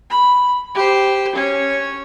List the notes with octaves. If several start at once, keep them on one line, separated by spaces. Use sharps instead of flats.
B5
G4 C5
C#4 C#5